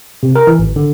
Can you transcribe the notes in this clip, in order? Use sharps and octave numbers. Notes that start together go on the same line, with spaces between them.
C3
A#4
E3
G#1
D3